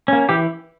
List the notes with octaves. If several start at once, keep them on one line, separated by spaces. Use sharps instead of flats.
A#3 C#4
E3 G4